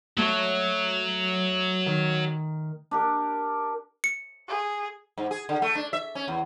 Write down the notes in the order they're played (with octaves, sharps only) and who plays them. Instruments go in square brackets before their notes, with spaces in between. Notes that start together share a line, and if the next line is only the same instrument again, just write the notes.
[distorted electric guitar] F#3 [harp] A3 C#5
[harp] D#3
[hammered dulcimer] D4 G4 A#4
[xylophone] C#7
[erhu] G#4
[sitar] G#2
G#4
D3
A3
D4
E5
C#4
E2